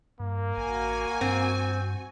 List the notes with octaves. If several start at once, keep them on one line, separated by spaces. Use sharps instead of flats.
G2 A#3
A1 F#4 G#5
G2 C4